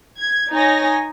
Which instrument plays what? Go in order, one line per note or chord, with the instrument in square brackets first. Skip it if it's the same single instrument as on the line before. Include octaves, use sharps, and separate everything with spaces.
[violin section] G#6
D#4 C#5 G#5 A#6